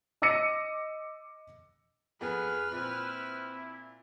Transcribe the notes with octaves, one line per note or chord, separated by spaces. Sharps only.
D#5 D6 E6 A#6 C#7 D#7
F2 B3 G#4 B4 F6
A#2 C4 E4